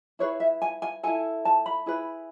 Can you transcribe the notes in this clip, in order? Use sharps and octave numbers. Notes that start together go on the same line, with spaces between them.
E4 G#4 B4 C#5
E5
G#5
G#5
E4 A4 G#5
A5
B5
E4 G#4 B4